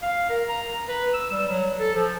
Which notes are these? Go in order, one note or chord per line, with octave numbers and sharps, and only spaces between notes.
F5
A#4
A#5
B4
E6
G3
F#3
A4
F3